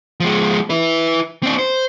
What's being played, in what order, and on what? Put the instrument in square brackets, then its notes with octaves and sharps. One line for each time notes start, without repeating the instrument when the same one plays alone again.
[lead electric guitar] F3 G#3
E4 B4
C4 D4
C5